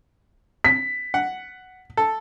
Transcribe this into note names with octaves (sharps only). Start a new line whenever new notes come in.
B6
F#5
A4